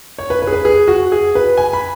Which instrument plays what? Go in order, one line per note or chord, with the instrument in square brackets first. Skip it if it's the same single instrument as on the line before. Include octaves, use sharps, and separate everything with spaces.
[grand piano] C#5
B4
B4
G#4
B4
G#4
F#4
G#4
B4
G#5
B5